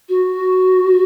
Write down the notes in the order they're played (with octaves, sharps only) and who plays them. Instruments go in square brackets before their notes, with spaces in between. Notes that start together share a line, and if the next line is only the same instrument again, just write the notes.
[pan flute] F#4